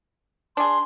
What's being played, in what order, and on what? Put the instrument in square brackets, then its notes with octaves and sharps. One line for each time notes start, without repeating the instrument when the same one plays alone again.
[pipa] D4 G#4 [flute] C6